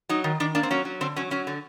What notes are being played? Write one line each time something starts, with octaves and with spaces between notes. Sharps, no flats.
F#3 D#4
D#3
D#3 D4
A#3 D4
C4
F#3 C#4
F#3
D3 C4
F#3 C#4
F#3 C#4
D3